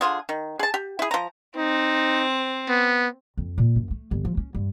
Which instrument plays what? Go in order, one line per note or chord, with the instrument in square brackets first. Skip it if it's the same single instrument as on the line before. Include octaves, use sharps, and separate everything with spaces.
[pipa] D3 F4 G#4
D#3
G#4 A5
G4
E4 G#4
F3 A#5
[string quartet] C4 [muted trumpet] D#4
[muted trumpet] B3
[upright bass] F2
A#2
F#2
A3
G1
F3
C#4
G2